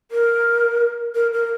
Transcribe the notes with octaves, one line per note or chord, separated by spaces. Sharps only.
A#4
A#4
A#4